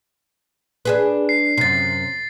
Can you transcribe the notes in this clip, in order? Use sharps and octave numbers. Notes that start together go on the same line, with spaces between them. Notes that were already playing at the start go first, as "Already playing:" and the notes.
D4 G#4 B4
C7
F#2 C3 A6 C7